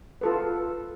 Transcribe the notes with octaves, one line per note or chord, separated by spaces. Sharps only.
F4 A4 B4